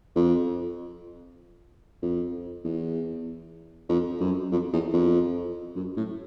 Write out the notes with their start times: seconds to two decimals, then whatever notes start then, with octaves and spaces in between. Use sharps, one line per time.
0.16 F2
2.02 F2
2.65 E2
3.89 F2
4.21 F#2
4.52 F2
4.73 E2
4.94 F2
5.76 F#2
5.97 A2